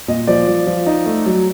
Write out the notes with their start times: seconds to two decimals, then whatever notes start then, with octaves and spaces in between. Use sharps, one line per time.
0.08 A#2 D#5
0.27 F3 D5
0.48 F3
0.67 F3
0.86 D#4
1.06 A3
1.26 F#3